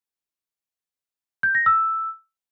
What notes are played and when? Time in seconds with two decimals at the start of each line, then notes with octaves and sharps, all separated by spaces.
1.43 G6
1.55 A#6
1.66 E6